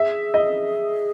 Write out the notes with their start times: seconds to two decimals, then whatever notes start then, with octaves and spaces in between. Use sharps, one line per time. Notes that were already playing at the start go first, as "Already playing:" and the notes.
Already playing: G#4 E5
0.34 D#5